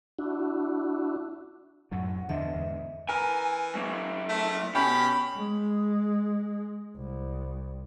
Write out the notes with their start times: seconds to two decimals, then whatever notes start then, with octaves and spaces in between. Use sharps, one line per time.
0.19 D4 E4 F#4
1.91 F#2 A2 F#3 F#5
2.29 E2 D3 F3 D#5 E5
2.53 E2 G#2
3.09 E3 A#4 G#5
3.75 F#3 A#3
4.29 A3
4.75 B2 C#4 G4 B5
5.35 G#3
6.96 C2